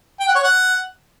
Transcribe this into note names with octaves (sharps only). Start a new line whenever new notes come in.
G5
F#5
C#5
F#5